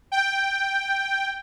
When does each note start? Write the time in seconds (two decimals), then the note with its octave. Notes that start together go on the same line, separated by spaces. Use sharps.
0.12 G5